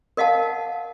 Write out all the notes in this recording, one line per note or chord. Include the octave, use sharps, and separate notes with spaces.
A#4 D#5 F5 F#5 A5